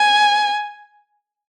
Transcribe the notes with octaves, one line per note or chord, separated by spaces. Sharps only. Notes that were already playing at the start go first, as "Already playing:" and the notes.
Already playing: G#5